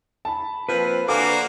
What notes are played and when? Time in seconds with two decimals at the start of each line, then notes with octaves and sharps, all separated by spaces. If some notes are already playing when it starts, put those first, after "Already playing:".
0.25 A5 B5
0.69 F3 A#3 C4 B4
1.08 D3 A#3 F#4 F5 G#5 D6